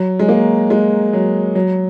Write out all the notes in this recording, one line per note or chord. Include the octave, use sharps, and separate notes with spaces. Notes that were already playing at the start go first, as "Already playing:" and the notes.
Already playing: F#3
G#3
A#3
G#3
F#3
F#3